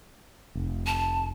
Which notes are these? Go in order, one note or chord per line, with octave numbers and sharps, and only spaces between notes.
F1
A5